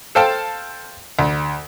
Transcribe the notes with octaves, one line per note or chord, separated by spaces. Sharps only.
A4 C5 F5 G5 A5
D2